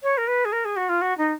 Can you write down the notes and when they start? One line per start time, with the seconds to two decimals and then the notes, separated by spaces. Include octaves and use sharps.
0.03 C#5
0.17 A#4
0.27 B4
0.45 G#4
0.52 A#4
0.65 G#4
0.76 F#4
0.89 F4
1.01 F#4
1.18 D#4